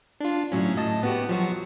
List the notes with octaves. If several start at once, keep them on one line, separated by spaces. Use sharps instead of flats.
D4 F4
A2 F#3 C#4
A2 D#5 A5
B3 F#4 G4
F3 F#3 F#4